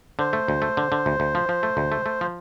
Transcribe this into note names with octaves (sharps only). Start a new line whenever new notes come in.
D3 C5
A3
D2
A3
D3
D3
D2
D2
F3
F3
A3
D2
A3
A3
F3